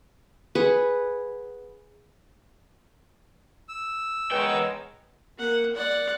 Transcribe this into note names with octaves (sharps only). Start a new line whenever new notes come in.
G#4 B4 F#5
E6
G#3 B3 A#4 B4 C#5 G5
A#3 F#5
D5 F#5